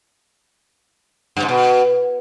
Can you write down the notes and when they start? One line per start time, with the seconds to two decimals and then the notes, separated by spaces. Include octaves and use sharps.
1.36 G2
1.42 G#2
1.48 B2